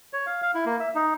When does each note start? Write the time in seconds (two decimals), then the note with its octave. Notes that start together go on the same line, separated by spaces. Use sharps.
0.13 C#5
0.26 F5
0.42 F5
0.55 E4
0.66 A#3
0.80 E5
0.95 D#4